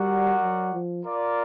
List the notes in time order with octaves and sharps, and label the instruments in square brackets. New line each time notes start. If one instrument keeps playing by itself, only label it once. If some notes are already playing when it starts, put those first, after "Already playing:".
Already playing: [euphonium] G3 [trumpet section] F#4 A#4 D5 F#5
[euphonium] F#3
F3
[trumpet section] F4 A#4 D5